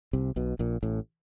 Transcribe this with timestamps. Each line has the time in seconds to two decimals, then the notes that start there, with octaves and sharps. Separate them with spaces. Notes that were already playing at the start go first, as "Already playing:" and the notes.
0.13 C2 C3
0.36 B1 B2
0.59 A#1 A#2
0.83 A1 A2